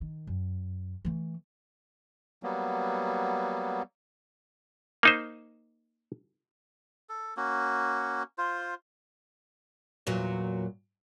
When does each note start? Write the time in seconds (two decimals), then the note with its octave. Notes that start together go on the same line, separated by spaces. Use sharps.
0.01 D#3
0.27 F#2
1.05 E3 A3
2.43 F#3 G3 A#3 B3
5.03 A#3 D#4 C5
7.09 A4
7.37 A#3 C#4 F#4
8.38 F4 C5
10.07 E2 A#2 F#3